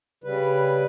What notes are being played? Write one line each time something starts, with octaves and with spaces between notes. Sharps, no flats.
C#3 G3 B4